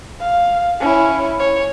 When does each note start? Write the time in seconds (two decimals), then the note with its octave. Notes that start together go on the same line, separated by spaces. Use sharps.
0.21 F5
0.81 C#4 E4
1.39 C#5